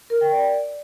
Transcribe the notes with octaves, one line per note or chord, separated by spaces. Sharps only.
A#4
G5
D5